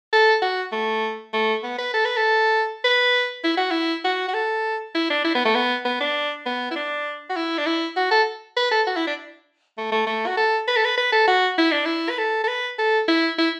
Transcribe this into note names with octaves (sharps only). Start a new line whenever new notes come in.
A4
F#4
A3
A3
B3
B4
A4
B4
A4
B4
E4
F#4
E4
F#4
F#4
A4
E4
D4
E4
B3
A3
B3
B3
D4
B3
E4
D4
F#4
E4
D4
E4
F#4
A4
B4
A4
F#4
E4
D4
A3
A3
A3
F#4
A4
B4
A4
B4
B4
A4
F#4
E4
D4
E4
B4
A4
A4
B4
A4
E4
E4